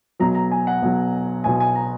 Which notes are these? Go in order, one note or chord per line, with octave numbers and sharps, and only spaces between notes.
B1 B2 F#3 A#5
A#5
G#5
F#5
B1 B2 F#3
B1 B2 F#3 G#5
G#5
A#5